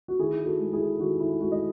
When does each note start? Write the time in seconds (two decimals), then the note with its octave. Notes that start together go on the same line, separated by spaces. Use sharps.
0.08 F#4
0.19 D#3 E4 G#4
0.46 F#4 A4
0.60 G#3
0.73 E4 G#4
0.99 D#3 F#4
1.20 E4
1.40 G#3 F#4
1.52 D#5